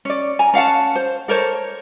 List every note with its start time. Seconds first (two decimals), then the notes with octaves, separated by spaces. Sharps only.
0.05 C#4 D5
0.39 G#5 A#5
0.54 C#4 F5 F#5 A5
0.95 C5
1.28 A4 A#4 C5 C#5